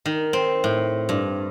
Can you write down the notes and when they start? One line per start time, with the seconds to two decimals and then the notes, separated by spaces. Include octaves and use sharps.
0.06 D#3
0.33 C4
0.64 A2
1.09 G2